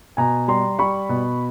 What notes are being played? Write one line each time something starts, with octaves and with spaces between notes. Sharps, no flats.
B2 G#5 A#5
G3 A#5 C6
G3 B5 C#6
B2